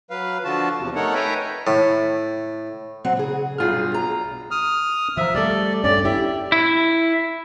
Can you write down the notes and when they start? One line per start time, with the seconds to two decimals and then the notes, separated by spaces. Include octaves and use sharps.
0.11 F#3 B4 F5
0.45 D3 F3 F4 F#4 A5
0.78 E2 C3 F3
0.95 A3 D#4 A4 A#4 C#5 F#5
1.15 B4 C#5 E5 G5 G#5 A#5
1.67 A2
3.04 F#3 C4 F#5
3.17 C#3 G#4
3.58 B1 G2 F4 G#4 F6
3.94 A#5
4.51 D#6 F6
5.17 F3 E5 A#5
5.35 G3 A3 A4 D5
5.84 G2 C#4 D5
6.05 E4 G4 E5
6.52 E4